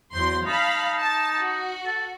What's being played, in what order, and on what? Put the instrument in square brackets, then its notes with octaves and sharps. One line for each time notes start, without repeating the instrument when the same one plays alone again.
[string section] E2 F#3 C6 [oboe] C5
[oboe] D#4 [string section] F5 A5 B5
[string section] A5
F#4
[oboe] A4